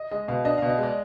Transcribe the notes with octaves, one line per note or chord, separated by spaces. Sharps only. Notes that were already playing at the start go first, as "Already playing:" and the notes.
Already playing: D#5
G#3 D#5
B2 F5
D4 D#5
F5
B2
D#5
G#3
D5